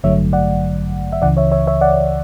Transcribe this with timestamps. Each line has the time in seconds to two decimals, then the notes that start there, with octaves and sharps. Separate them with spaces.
0.04 A1 G2 D3 F#3 A3 C#5 E5
0.33 D5 F#5
1.13 E5
1.22 C#2 C#3 E3 D5 F#5
1.37 C#5 E5
1.52 C#5 E5
1.67 C#5 E5
1.81 D5 F#5